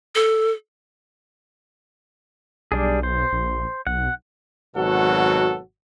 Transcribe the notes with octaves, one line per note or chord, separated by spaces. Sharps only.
A4
B1 G3 D4 G#4
C5
A#1
B1 F#5
G#1 B2 F#3 F#4 A4 F#5